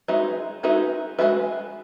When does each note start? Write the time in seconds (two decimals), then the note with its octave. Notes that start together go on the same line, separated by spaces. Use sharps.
0.08 G#3 D#4 F#4 B4 E5
0.63 G#3 D#4 F#4 B4 E5
1.19 G#3 D#4 F#4 B4 E5